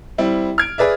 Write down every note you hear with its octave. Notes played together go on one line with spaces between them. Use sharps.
G3 C4 E4
F6 G#6 D7
G#4 B4 D5 E5